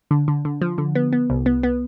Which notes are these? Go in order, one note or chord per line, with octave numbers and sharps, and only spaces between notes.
D3
D3
D3
F3
D3
B3
B3
C2
B3
B3